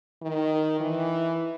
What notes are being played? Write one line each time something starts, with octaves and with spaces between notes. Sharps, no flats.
D#3
E3